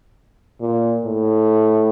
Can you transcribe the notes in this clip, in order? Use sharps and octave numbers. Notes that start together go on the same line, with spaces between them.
A#2
A2